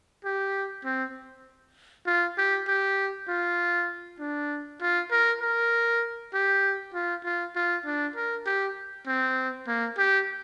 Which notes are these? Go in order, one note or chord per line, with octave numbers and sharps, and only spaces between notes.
G4
C4
F4
G4
G4
F4
D4
F4
A#4
A#4
G4
F4
F4
F4
D4
A#4
G4
C4
A#3
G4